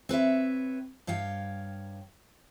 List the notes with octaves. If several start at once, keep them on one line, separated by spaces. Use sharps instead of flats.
C4 B4 C#5 E5
G2 C#5 F5 G5